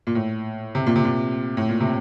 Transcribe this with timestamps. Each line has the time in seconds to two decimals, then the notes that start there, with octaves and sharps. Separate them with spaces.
0.07 A#2
0.15 A2
0.75 C3
0.86 A#2
0.96 C3
1.04 A#2
1.57 A2
1.69 A#2
1.80 C3